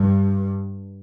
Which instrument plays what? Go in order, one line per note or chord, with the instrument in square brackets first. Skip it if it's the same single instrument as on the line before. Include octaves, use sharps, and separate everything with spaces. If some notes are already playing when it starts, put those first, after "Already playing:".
Already playing: [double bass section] G2